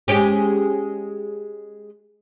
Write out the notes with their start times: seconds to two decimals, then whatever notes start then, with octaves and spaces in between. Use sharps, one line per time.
0.08 G#3 C#4 G4